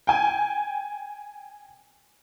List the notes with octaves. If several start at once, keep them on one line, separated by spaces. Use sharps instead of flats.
G5 G#5